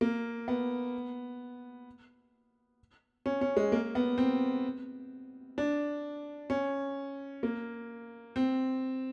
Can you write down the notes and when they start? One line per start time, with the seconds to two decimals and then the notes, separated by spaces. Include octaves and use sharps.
0.01 A#3
0.48 B3
3.26 C#4
3.41 C#4
3.57 G#3
3.72 A#3
3.95 B3
4.18 C4
5.58 D4
6.50 C#4
7.43 A#3
8.36 C4